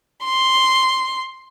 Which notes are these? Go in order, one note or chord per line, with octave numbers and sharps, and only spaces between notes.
C6